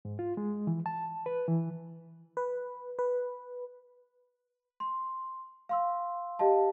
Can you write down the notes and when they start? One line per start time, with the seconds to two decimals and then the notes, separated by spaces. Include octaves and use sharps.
0.05 G#2
0.19 F4
0.37 G#3
0.67 E3
0.86 A5
1.26 B4
1.48 E3
2.37 B4
2.99 B4
4.80 C6
5.69 F5 C6 E6
6.39 G4 D#5 F5 A5